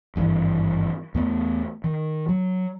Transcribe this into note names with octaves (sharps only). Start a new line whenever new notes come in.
G#1 G2 C#3 E3
E2 A3 B3
D#3
F#3